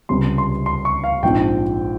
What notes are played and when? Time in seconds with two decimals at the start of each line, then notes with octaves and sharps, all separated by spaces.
0.09 C#2 C3 G3 C#4 C6
0.38 C6
0.66 C6
0.85 C#6
1.04 F5
1.23 A#1 G#2 F3 C4 D#4 G5